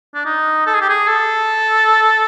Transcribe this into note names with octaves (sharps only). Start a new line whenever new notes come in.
D4
D#4
A4
G#4
G4
G#4
A4